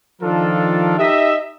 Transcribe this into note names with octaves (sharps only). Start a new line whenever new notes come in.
D#3 F3 D4 F4 A4 A#4
D#4 G4 D#5 E5